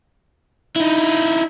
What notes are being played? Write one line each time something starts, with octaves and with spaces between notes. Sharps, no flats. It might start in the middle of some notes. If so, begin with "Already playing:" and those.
D#4 E4